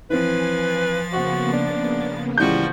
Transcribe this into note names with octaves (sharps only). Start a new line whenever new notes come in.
E3 F3 C4 B4 G#5 A6
C#3 A#3 B3 F#4 C5 F#5
D4
C#2 A2 E3 F3 G3 F#4 G6